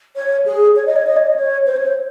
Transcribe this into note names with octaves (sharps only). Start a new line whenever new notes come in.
C#5
G#4
C#5
D#5
C#5
D#5
C#5
D#5
C#5
C5
C#5
C5